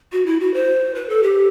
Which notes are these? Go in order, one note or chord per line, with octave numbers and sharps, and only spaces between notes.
F#4
E4
F#4
C5
B4
A4
G4